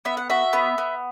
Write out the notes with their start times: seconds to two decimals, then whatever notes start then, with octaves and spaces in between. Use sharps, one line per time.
0.05 B3 E5
0.17 F#5
0.30 F#4 E5
0.53 B3
0.78 B3